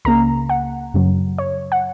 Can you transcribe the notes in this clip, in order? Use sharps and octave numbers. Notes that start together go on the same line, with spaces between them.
C#2 C#3 A#3 A#5
F#5
F#2 C#3 F#3
C#5
F#5